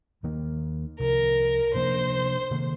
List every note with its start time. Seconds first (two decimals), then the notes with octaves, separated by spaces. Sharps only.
0.23 D#2 D#3 A#3
0.99 C2 C3 F3 A#4
1.74 C3 F3 A#3 D4 C5
2.51 C3 D#3 A#3